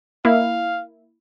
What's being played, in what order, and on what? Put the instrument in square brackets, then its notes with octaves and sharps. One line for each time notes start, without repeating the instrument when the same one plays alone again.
[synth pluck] A#3 E4 [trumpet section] F5